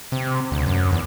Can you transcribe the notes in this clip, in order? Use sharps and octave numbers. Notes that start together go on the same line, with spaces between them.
C3
D2
F#2
E2